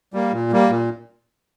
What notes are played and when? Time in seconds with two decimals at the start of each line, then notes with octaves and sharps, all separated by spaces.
0.14 G3 A#3
0.32 A#2
0.52 G3 A#3
0.70 A#2